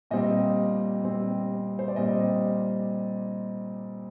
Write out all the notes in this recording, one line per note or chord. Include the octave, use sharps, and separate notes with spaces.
A#2 G3 C4 D#5
A#2 G3 C4
C5
D5
A#2 G3 C4 D#5